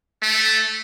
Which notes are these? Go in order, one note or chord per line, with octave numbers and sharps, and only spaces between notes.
A3